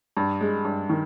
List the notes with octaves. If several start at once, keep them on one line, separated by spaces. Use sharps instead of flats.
G2
G#3
G2
D#3